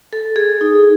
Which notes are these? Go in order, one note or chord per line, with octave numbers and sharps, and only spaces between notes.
A4
G#4
D#4